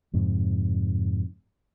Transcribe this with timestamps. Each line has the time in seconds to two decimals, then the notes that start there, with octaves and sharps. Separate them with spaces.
0.14 F2 G#2 C3